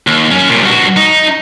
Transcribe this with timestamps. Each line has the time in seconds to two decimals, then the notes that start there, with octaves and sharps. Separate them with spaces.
0.07 D#2
0.31 F#2 C#4
0.49 C2 A#2
0.63 G2 F#4
0.96 D#4